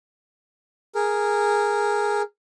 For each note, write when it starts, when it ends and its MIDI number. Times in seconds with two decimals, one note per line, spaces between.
0.95 2.22 68
0.95 2.22 70